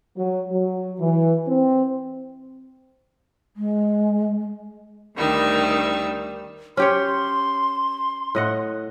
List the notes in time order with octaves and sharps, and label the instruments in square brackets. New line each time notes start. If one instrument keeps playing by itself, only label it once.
[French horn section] F#3
F#3
E3
C4
[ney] G#3
[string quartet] D2 D#3 G3 E6
[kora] C#4 G4 C#5 [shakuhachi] C6
[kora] A2 D#5 F#5